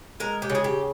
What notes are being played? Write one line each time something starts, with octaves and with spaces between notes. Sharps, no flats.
G#3 A#4
G4
C#3
G#4
G4